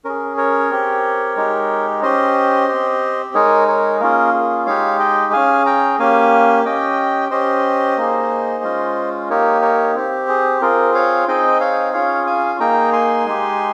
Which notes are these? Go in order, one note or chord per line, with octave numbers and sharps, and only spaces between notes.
C#4 G#4 A#4
A#4 C#5
C4 G4
G#3 D#4 G4
C#4 G4 C5 D#5
G4
C4
G#3 D#4 G#4 A#4 C#5
A#4 C#5
A#3 C#4 F4 G#4 A#4
G#4
G#3 D#4 G4 C#5 F5
D#5 G5
C#4 G#4 F5 G#5
G5 A#5
A#3 C#4 G4 F5 G#5
C#4 G4 D#5 G5
C#4 G4 C5 D#5
A#3 D#4 G#4
G#3 C#4 F4
A#3 D#4 G4 A#4 C#5
A#4 C#5
C4 G4
G#4
C4 F4 G#4 A#4
C#5 F5
C4 D#4 G#4 D#5 G5
C#5 F5
C#4 F4 G#4 C#5 F5
F5 G#5
A#3 D#4 G#4 G5 A#5
G#5 C6
G#3 D#4 G4